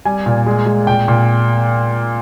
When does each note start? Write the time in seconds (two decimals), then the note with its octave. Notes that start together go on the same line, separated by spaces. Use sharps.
0.05 G3 G#5
0.26 A#2
0.47 G#3
0.66 G#3
0.87 A#2 G5
1.08 A#2